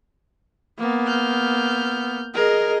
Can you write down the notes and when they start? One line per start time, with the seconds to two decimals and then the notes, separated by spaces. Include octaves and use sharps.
0.79 A#3 B3
1.07 F6 G6
2.34 G#4 A#4 D#5